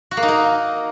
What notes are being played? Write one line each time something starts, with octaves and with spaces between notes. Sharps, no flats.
F#4
A#3
D#4
A#3